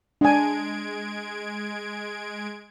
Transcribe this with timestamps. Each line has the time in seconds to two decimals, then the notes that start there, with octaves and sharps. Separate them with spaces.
0.21 G#3 D4 G#5 G#6 D7